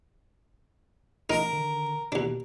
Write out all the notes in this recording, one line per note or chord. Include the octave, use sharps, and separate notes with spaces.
A1 D#4 A#4
D3 D#3
D#2 B2 D4